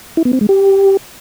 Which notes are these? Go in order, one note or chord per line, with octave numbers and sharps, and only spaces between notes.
E4
B3
C4
G#3
G4